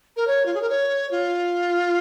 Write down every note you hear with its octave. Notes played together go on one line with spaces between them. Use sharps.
A#4
C#5
F4
G#4
A#4
C#5
F4